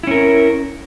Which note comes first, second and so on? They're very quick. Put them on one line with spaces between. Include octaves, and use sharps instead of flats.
E4 C#4 A#4